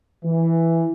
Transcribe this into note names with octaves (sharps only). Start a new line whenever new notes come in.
E3